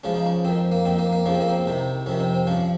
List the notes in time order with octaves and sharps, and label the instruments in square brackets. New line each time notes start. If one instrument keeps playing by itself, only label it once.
[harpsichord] C#2 C#3 F3 C#4
D#4
C#4
F2 D#3 C4
A#3
F2 D#3 C4
A#3
A#3
F2 C#3 F3 C#4
C4
A#3
C4
C2 C3 D#3
F2 C3 D#3 C#4
C4
C4
G2 F3 C#4